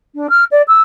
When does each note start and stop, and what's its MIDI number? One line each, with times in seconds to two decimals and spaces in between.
0.15 0.27 62
0.30 0.44 89
0.51 0.62 74
0.68 0.82 88